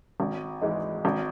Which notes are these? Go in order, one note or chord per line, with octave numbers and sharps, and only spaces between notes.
G#1
G#2 E3 G#3 D#4
G#1